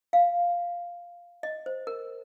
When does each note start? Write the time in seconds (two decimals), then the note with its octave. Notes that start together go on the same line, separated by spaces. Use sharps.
0.13 F5
1.43 D#5
1.66 C5
1.87 A#4